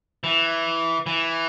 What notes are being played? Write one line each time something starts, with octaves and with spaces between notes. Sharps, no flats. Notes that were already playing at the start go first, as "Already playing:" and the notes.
E3
E3